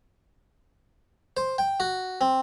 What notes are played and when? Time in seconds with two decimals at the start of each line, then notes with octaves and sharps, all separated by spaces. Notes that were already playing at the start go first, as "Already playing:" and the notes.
1.37 C5
1.58 G5
1.80 F#4
2.21 C4